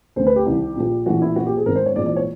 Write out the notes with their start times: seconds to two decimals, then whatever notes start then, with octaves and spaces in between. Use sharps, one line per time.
0.16 D2 D3 C5
0.27 B4
0.36 G4
0.46 C2 C3 D#3
0.76 A#1 A#2
1.06 A#1 A2 E3 F#4
1.22 E4
1.36 A#1 A#2 F#4
1.46 G4
1.57 G#4
1.66 G#1 G#2 D#3 A#4
1.75 C5
1.86 C#5
1.96 A#1 G#2 E3 D5
2.06 D5
2.16 C#5